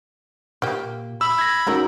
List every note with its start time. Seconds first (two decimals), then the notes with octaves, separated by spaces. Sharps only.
0.62 A#2 A#3 G4
1.21 B5 E6
1.39 G#6 A#6
1.67 D#3 G#3 C#4 F#4 A4 A#4